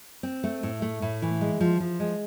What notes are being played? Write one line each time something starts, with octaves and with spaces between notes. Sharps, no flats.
C4
A3
A2
A3
A2
E3
G#3
F3
F3
G#3